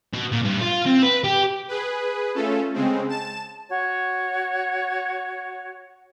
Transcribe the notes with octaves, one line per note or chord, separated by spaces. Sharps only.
B2
A#2
G2
F4
C4
B4
G4
G#4 B4
A3 C#4 F4 A4
C#3 G#3 C4
A5 E7
F#4 C#5